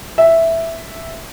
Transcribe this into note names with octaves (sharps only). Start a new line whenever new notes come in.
E5